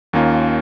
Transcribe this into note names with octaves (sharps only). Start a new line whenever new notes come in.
D#2 D#3 A#3 C#4 F4